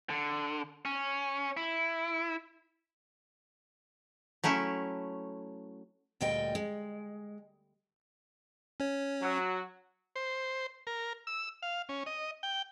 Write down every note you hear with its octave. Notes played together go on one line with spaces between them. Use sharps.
D3
C#4
E4
F#3 A3 C#4 E4
D2 A#2 G3 D#5 G5
G#3
C#4 C#5
F#3 F#4
C5
A#4
E6
F5
C#4
D#5
G5